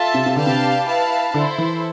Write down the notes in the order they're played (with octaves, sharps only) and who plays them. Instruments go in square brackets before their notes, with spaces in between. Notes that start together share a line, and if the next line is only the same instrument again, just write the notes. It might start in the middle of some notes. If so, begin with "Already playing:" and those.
Already playing: [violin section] F4 A4 E5 A5
[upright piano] C3
C3
[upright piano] D3 [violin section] D4 G4 B4 F5 A5
[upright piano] C3
[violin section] E4 B4 F5 A5
[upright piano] D3 [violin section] E4 A4 C5
[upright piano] E3